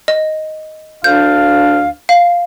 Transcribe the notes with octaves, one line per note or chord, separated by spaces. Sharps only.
D#5
D2 D4 F5 G6
F5